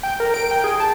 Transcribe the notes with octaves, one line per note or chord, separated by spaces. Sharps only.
G5
A#4
D7
G5
G#4
A5